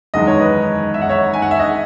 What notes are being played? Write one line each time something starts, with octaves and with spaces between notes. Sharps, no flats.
F#1 E2 D#3 G#3 D#5
C#5
B4 D#5
E5
F#5
C#5 E5
G#5
F#5
E5
D#5 F#5